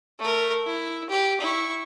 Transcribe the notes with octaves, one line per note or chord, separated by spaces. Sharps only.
A3 A#4
E4
G4
E4 C#6